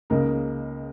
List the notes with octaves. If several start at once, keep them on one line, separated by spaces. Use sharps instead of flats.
C#2 C#3 A#3 D#4 A#4